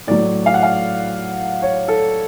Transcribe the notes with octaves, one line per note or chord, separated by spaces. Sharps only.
A2 F#3 D5
F5
F#5
F5
C#5
A4